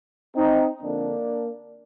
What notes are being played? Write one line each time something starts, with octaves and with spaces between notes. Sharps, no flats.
C4 D#4
F2 D3 A#3 D4